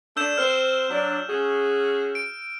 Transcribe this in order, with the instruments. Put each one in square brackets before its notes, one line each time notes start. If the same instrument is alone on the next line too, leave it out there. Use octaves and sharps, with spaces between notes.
[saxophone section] A3 D4 [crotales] E6 G6 E7
[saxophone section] C4 C5 [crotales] F6
[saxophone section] F#3 D4
C#4 F#4 G#4
[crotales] D7